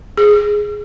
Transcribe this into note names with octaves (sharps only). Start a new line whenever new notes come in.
G#4